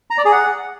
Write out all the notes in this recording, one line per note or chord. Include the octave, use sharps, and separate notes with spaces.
A#5
D5
G#4
F#5